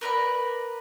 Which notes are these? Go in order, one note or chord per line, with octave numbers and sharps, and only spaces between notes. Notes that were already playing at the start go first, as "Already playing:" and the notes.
A#4 B4 D5 B5